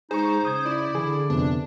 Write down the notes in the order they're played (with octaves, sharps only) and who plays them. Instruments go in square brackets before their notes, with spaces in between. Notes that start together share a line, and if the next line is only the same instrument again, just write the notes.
[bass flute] G#3 [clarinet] D#4 [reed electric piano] G#4 C#6 [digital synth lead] C5
[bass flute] C#3 [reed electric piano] D#6 G6 G#6
[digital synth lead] E4 [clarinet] D5
[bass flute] D3 [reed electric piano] E3 G#4
[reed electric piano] F2 C3 B3 [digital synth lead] D4